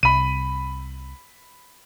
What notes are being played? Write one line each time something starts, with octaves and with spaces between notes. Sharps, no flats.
C2 B5 D#7